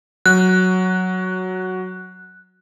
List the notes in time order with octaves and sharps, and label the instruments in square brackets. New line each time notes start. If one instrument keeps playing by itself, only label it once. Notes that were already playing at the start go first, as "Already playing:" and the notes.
[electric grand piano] F#3 [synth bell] F#6